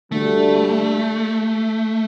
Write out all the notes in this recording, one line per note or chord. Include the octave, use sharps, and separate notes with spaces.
D2 D3 G3 A3